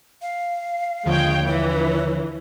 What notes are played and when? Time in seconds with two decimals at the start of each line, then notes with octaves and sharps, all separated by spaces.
0.22 F5
1.06 D#2 D3 F3 G#3 C#5 G5
1.47 E3 C#5